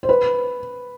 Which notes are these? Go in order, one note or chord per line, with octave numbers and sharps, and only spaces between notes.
C5
B4